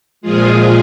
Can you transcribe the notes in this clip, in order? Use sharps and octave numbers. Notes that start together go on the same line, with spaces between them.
A#2 F3 G#3 F4 G#4